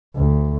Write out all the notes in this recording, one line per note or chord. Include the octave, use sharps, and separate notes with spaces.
D2